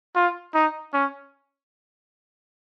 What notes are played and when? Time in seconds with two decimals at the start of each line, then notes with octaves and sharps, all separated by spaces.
0.16 F4
0.55 D#4
0.94 C#4